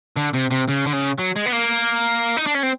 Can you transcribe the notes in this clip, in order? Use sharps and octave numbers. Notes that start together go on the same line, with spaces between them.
D3
C3
C3
C#3
D3
C#3
F#3
G#3
B3
A#3
D#4
D4
C#4
C4